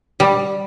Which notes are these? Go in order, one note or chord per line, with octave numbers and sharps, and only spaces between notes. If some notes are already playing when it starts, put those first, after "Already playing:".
G3